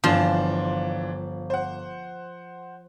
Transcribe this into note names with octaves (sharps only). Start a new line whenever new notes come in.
G1 E3 F3 D4 C6 E7
C5 F#5